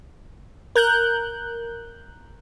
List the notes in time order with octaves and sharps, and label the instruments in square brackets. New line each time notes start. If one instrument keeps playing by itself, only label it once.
[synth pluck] A#4 F#6 G6